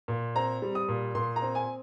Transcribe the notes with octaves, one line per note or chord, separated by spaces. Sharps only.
A#2
C4 A#5
G3
D#6
A#2
A#2 C6
A#5
C4
G#5